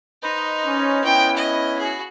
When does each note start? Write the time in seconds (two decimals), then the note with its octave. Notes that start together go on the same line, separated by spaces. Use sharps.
0.23 D#4 B4 C5 D#5
0.66 C#4
1.04 B3 C#4 E4 G5
1.37 D#5 B5
1.79 F#4 G#4